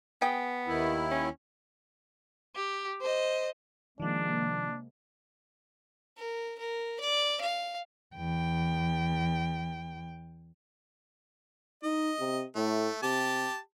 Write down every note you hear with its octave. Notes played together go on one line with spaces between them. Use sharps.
B3 G#4 G5
D#2 D#3 E4
C#4
G4
C5 D#5
C3 D#3 F3 G#3 A#3 D4
A#4
A#4
D5
F5
E2 G5
D#4 D#5
C3
A2 A3
C3 G4 A5